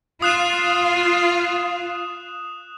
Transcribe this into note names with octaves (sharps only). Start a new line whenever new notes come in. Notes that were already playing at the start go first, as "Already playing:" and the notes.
F4 D#6 F#6 E7